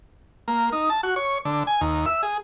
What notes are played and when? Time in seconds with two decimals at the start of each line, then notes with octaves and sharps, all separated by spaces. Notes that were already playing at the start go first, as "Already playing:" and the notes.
0.48 A#3
0.72 D#4
0.90 A5
1.03 F#4
1.16 C#5
1.45 D3
1.67 G#5
1.81 D#2
2.06 E5
2.23 G#4